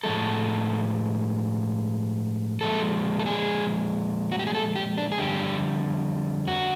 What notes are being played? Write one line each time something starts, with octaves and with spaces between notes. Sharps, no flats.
A2 F3 G#3 A4
A#2 F3 G#3 A4
A4
G#4
F#4
G4
G#4
A4
G4
D4
G#4
F2 D3 G3 G4
F#4